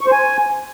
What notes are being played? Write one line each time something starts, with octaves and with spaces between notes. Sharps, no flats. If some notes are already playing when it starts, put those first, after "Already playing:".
C#6
C5
G#5